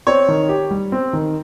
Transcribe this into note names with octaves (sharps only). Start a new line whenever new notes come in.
C4 C#5
D#3
G4
G3
C4
D#3